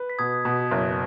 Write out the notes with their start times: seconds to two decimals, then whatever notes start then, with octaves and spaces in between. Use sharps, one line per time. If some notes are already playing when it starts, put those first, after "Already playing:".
Already playing: B4
0.10 B6
0.19 B2 D#6 G#6
0.45 B2
0.71 F#1